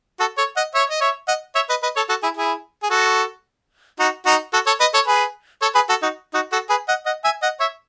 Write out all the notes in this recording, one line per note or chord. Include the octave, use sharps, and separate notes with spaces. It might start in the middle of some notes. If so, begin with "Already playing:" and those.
F#4 A4
A4 C#5
D#5 F#5
C#5 E5
D#5
C#5 E5
D#5 F#5
C#5 E5
B4 D#5
B4 D#5
A4 C#5
F#4 A4
E4 G#4
E4 G#4
G#4
F#4 A4
D#4 F#4
D#4 F#4
F#4 A4
A4 C#5
B4 D#5
A4 C#5
G#4 B4
A4 C#5
G#4 B4
F#4 A4
D#4 F#4
D#4 F#4
F#4 A4
G#4 B4
D#5 F#5
D#5 F#5
E5 G#5
D#5 F#5
C#5 E5